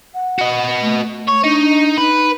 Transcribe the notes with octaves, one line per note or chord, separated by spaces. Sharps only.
F#5
F#4 D#5
A3
C#5
D4 D#4
D#4 B4